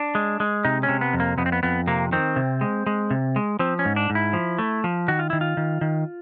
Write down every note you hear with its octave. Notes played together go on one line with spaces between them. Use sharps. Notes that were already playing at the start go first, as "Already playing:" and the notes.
Already playing: D4
G#3
G#3
C3 D#4
C#4
C3
B3
F2
A#3
F2 B3
C4
B3
F2 B3
C3 A#3
D#3 C4
C3
G#3
G#3
C3
G#3
F3 C4
C#4
G#2
D4
G#2
E4
F3
A3
F3
D#3 F#4
F4
D#3 E4
F4
D#3
D#3